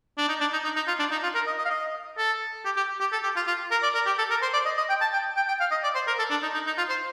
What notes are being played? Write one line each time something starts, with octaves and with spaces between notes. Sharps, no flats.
D4
D#4
D4
D#4
D#4
D#4
F4
D4
D#4
F4
A#4
D#5
D#5
F5
D#5
A4
G4
G4
G4
A4
G4
F4
F4
A#4
D5
A#4
G4
A4
A#4
C5
D5
D#5
D#5
G5
A5
G5
G5
G5
F5
D#5
D5
C5
A#4
A4
D4
D#4
D#4
D#4
F4
C5